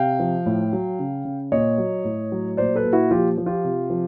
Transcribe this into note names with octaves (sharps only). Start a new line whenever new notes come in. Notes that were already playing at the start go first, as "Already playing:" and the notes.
Already playing: C3 F5 G5
F3
A2
F#3
C#3
C#3
A#2 C#5 D#5
F#3
A2
F#3
A#2 C5 D5
A4 B4
A#2
E4 F#4
F3 F4 G4
F3
F4 G4
C3
F3